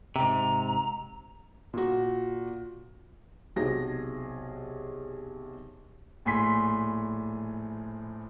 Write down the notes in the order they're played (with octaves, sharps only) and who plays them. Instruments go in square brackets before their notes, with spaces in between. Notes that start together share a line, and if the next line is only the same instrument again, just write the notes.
[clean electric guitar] G#2 C3 [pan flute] A#5
[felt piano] A#2 F#4
B1 C3 G#4 A#6
[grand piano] A#1 A2 G#5 C6 B6